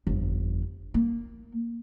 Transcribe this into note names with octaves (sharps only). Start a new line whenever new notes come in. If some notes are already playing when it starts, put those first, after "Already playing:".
G1 F2
A#3